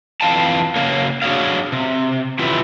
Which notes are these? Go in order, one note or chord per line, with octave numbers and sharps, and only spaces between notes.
F2 E3 F5 G5 A5
C#3 A#3 A#4 C#5 F5
D4 F#4 G#4 C#5 F5
C3
D#3 C#4 E4 F4 G4 B4